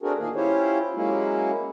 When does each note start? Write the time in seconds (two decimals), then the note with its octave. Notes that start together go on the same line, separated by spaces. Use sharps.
0.02 A3 C4 D4 F#4 G#4 A#4
0.19 A#2 D#3 A#3 G#4
0.36 C#4 E4 F4 G4 C5 C#5
0.95 F#3 G#3 A#3 C#4 E4